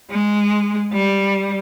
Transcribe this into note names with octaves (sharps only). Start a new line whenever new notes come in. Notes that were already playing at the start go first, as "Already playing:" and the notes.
G#3
G3